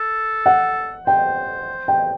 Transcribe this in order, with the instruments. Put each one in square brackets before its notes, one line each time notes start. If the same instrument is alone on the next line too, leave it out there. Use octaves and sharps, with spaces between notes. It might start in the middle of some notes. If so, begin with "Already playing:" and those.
Already playing: [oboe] A4
[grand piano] F#5
[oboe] C5 [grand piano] G5
[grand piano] G5